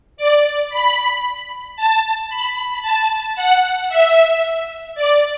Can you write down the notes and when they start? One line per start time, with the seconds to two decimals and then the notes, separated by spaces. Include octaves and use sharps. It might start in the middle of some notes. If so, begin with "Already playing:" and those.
0.17 D5
0.70 B5
1.77 A5
2.29 B5
2.82 A5
3.36 F#5
3.89 E5
4.95 D5